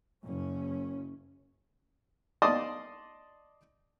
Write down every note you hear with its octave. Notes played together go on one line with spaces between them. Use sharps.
F#1 C#4
D5 D#5 A5 C6 D6 D#6